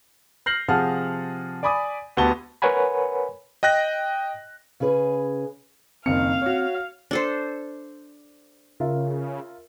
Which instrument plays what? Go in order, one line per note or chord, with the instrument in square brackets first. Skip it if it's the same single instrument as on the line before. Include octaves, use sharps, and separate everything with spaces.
[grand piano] F6 G6 A#6 C7 F#7
C3 F3 G#4 F#5 A5 F6
D5 G#5 B5 D6 D#6
D2 B3 F#4 G4 A5 G7
[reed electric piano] A#4 B4 C#5 F#5 G#5 B5
[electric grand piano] D#5 G5 F#6 A#6
[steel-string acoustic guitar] C#3 C#4 G#4 B4
[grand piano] F#1 D#3 C#7 [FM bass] C4 [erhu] F5
[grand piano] F#4 C#5
[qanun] D4 A4 C5
[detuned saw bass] C#3 [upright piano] F4 A#4 E5